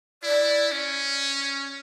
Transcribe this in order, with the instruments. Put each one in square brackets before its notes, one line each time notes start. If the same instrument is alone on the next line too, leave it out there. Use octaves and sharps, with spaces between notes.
[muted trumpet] E4 [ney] D5
[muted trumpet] C#4